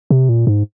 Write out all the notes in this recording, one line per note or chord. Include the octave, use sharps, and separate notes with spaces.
C3
A#2
G#2